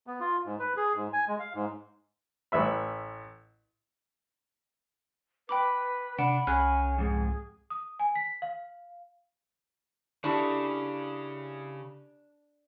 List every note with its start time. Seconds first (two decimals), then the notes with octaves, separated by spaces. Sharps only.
0.07 B3
0.20 F4
0.46 G#2
0.60 B4
0.77 G#4
0.96 G#2
1.13 G#5
1.28 G#3
1.39 F5
1.54 G#2
2.52 A1 B4 E5 B5
5.49 B4 G5 B5 D6
6.19 C3 D4 F#5 B5
6.47 C2 C#4 G#4 F6 F#6
6.98 F2 G#2 G#4
7.70 D#6
8.00 G#5
8.16 B6
8.42 F5
10.24 C#3 D4 E4 G4 A4 B5 C#6